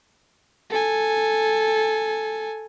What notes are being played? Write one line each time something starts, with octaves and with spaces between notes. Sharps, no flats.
A4 G#5